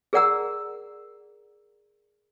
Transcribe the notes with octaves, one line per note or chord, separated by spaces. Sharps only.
G#4 A#4 D5 F#5 A#5 E6